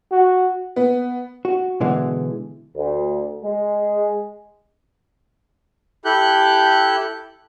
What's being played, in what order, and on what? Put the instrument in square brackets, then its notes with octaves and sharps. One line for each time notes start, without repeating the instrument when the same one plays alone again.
[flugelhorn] F#4
[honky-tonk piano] B3
[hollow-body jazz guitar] F#4
B2 D3 E3 G#3
[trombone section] D2
G#3
[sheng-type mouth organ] E4 G4 A4 F#6 G6